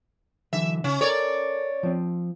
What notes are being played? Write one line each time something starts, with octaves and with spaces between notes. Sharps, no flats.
D3 E3 F#3 E5
C#3 C#4
A4 A#4 C#5 D5
F3 C4